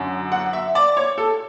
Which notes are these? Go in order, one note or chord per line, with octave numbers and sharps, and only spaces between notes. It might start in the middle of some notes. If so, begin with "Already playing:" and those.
Already playing: F#2 D3
F#5
E5
D5
C#5
A4